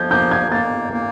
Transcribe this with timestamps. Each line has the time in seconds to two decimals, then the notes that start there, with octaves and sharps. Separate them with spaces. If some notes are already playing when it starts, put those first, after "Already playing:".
Already playing: F3 G6 G#6
0.11 A#3 G6
0.31 G#6
0.52 A#3 A6
0.93 A#3